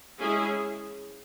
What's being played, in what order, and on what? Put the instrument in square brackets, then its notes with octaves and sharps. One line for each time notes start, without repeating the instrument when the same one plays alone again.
[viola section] G#3 C#4 E4 G#4